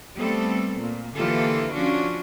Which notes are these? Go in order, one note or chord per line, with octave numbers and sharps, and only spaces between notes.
G3 A3 B3 C4 A4
A#2
D3 E3 A#3 F4 G4 A4
F3 C#4 D4 F4 F#4